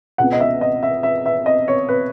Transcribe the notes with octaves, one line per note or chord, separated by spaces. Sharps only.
C#2 B2 F#5
D#5
E5
D#5
E5
E5
E5
D#5
C#5
B4